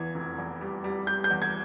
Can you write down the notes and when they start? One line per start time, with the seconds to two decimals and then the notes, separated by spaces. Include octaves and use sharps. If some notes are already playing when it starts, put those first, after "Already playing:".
Already playing: E2 E3 G#6
0.15 F1
0.38 E2
0.61 G3
0.84 G3
1.07 G3 G6
1.24 G6
1.30 E2
1.42 G#6